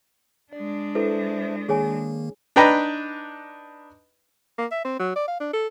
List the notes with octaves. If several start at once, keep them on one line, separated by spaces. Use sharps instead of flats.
G#3 D4 D5
E4 A4 B4 C5 E5
D#3 A#3 G#4 C#5 G#5
D4 D#4 B4 G5 A#5 B5
A#3
E5
C4
F#3
D5
F5
D4
A4